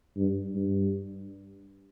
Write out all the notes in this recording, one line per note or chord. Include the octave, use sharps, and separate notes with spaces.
G2
G2